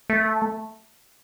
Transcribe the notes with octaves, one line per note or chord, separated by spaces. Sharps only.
A3